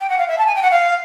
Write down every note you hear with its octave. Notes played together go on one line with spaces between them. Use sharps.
G5
F#5
F5
E5
A5
G#5
G5
F#5
F5